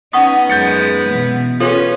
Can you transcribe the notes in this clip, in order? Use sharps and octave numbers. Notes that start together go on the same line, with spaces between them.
B3 C#4 D#4 F#5 C#6 D#6
F#2 G#3 D#4 G6 A6 C#7
B2 E3
C#4 F4 G#4 A4 B4